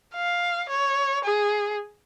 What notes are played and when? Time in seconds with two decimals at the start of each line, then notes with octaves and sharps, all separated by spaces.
0.14 F5
0.69 C#5
1.24 G#4